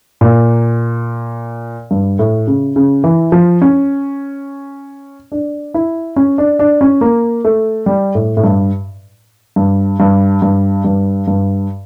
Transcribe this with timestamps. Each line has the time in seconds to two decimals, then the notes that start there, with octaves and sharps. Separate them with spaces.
0.21 A#2
1.91 G2
2.19 A2
2.47 C#3
2.76 C#3
3.04 E3
3.32 F3
3.62 C#4
5.32 D4
5.74 E4
6.16 C#4
6.38 D4
6.59 D4
6.81 C#4
7.01 A#3
7.45 A3
7.86 G3
8.15 A2
8.37 A2
8.44 G2
9.56 G2
10.00 G2
10.42 G2
10.85 G2
11.28 G2